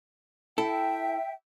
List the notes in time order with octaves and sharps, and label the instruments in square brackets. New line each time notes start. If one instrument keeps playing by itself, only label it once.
[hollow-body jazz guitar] E4 A4 [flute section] E5 G5